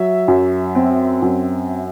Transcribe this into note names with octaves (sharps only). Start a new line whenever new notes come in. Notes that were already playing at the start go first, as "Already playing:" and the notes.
Already playing: F#3 E5
F#2
C4
F#2